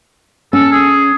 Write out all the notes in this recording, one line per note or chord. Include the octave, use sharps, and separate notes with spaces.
C#4 A4
G#4